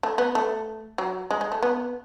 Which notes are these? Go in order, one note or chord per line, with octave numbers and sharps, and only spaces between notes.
A3
B3
A3
F#3
G#3
G#3
A3
B3